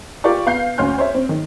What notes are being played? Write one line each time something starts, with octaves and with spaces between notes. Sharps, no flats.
F4 G4 A#4 D5 C#6
B3 F5 G6 C7
D2 C#4 C6 F6 G6
C5 C#5 E5
C4 C#5
D#3